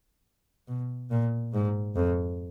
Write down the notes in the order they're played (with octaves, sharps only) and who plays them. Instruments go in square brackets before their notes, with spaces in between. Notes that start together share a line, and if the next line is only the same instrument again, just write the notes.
[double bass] B2
A#2
G#2
F2